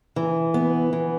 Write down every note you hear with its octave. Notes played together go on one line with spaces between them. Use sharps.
E3
B3
E3